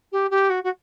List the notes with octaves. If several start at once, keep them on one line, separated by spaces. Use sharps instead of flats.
G4
G4
F#4
F#4